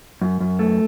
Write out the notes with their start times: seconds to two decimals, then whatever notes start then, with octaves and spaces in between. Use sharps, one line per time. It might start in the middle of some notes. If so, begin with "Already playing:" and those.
0.21 F#2
0.40 F#2
0.59 A3